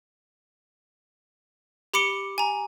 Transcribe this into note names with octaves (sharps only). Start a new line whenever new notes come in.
G4 B5 D6 C#7 D7 G7
G#5 A#5